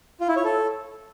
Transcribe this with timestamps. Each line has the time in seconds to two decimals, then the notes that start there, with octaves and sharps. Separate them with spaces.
0.20 F4
0.28 E4
0.36 C#5
0.44 A4